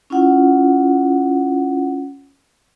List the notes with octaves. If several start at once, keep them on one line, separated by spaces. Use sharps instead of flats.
C#4 E4 F4 F#5